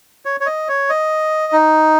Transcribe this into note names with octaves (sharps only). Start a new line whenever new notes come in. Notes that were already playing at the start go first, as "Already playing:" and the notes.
C#5
C#5
D#5
C#5
D#5
D#4